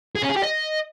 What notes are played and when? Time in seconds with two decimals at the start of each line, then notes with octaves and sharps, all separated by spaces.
0.15 G#4
0.22 C#4
0.29 G#4
0.36 G4
0.43 D#5